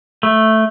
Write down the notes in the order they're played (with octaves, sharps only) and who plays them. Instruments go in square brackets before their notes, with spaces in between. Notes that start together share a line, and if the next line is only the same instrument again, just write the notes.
[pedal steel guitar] A3